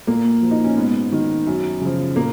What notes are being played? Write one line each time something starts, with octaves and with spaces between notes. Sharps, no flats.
A#2 A#3
F3
D#4
C#4
G#2 B3
D#3
F#2
C#3 F3
A#2 A#3